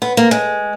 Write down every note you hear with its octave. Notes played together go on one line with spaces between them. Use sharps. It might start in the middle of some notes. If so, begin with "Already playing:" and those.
B3
A#3
G#3